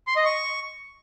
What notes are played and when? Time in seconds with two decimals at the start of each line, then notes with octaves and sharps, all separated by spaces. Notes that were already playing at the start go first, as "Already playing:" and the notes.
0.07 C6
0.16 D#5
0.25 C#6